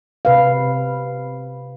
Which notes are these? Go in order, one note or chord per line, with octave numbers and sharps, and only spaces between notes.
C3 B4 F5